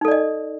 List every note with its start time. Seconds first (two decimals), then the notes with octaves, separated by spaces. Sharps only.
0.01 D#4
0.05 A4
0.08 D5
0.11 D#5